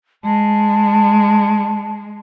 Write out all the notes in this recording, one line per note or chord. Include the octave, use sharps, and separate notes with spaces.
G#3 A5